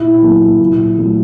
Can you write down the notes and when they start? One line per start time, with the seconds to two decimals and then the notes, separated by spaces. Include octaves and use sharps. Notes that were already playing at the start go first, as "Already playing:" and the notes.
Already playing: A#2 E4
0.22 F#3 A#3
0.61 A#2
0.98 F#3 A3